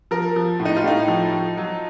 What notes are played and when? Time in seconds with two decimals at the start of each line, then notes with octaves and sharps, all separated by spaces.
0.11 F3 A#4
0.36 F3
0.60 A2
0.65 D#4
0.77 F4
0.84 A2 D#4
1.08 F3
1.33 F3
1.57 F#3